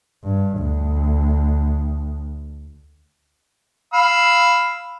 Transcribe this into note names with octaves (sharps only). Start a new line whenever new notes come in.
G2
D2
F5 B5 E6